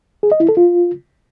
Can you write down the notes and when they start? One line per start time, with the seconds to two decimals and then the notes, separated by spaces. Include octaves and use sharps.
0.23 G#4
0.32 D#5
0.40 E4
0.49 A4
0.57 F4